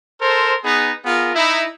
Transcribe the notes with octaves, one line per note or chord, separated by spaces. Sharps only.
A4 A#4 C5
B3 D#4 G#4 B4
B3 F4 G#4 A#4
D#4 E4